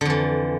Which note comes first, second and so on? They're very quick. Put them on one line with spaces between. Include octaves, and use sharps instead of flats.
D3 F2 E3